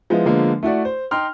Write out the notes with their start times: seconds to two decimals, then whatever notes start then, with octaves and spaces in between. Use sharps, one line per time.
0.10 F3 G#3 B3 E4 F4
0.26 D3 F3 G#3 A#3 B3
0.63 A3 E4 F#4 D5
0.85 C5
1.11 D#4 G5 C6 F6